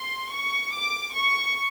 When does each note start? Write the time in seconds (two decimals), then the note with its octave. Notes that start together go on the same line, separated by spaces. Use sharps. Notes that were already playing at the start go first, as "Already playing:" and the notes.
Already playing: C6
0.33 C#6
0.74 D6
1.14 C#6